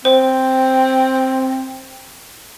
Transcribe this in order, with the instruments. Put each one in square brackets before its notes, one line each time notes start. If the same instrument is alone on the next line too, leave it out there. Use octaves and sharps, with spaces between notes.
[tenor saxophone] C4 [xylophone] C5